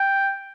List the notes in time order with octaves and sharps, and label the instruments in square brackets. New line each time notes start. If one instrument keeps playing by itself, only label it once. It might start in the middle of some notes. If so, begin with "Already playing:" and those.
Already playing: [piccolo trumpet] G5